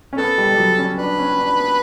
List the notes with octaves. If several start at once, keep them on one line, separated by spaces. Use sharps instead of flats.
C#4
B3 A4
G3
G3
F#3
C#4
D4 B4
C#4
D4
B3